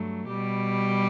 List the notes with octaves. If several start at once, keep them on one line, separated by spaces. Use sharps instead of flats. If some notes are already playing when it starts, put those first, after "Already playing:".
Already playing: G2 F#3 A3
B2 G3 G4